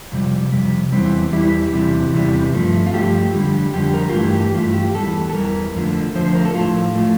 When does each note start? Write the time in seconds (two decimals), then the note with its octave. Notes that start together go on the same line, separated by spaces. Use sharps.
0.12 F2 C3 G3
0.52 F2 C3 G3
0.92 E2 E3 G3 C4
1.33 E2 E3 G3 E4
1.73 E2 C3 E3 G3
2.14 E2 C3 E3 G3
2.53 G2 F3 A3
2.87 F4
2.93 G2 F3 A3 G4
3.34 F2 D3 G3
3.73 F2 D3 G3 G4
3.94 A#4
4.09 F4
4.14 G2 E3 A3 G4
4.34 G4
4.54 G2 E3 A3 F4
4.74 G4
4.94 E2 E3 G3 A4
5.30 A4
5.34 E2 E3 G3 A#4
5.75 F2 D3 F3 A3
6.15 F2 D3 F3 A3 C5
6.25 C5
6.35 A#4
6.45 A4
6.54 A2 F3 A3 F4
6.95 A2 F3 A3